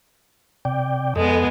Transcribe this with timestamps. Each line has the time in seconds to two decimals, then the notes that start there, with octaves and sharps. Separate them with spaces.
0.65 C3 D5 G5
1.16 F2 G#3 B3 A4 D#5